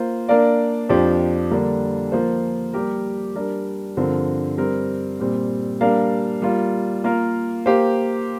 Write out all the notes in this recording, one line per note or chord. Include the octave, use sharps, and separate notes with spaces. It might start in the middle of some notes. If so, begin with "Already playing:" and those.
Already playing: A#3 F4 C5
A#3 D4 A#4 D5 F5
F2 F3 D4 G4 C5
D3 G3 A#3 D4
F3 A#3 F4 C5
G3 A#3 G4 A#4
G3 D4 A#4
G2 D3 F3 C4 A#4
G3 C4 A#4
A#2 G3 C4
G3 A#3 D4 A#4 F5
G3 A#3 F4
A#3 F4 A#4 F5
A#3 G4 C5 F5